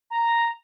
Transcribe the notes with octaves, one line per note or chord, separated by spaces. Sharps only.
A#5